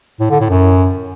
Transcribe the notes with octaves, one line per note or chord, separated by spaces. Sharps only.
A2
D3
A2
F#2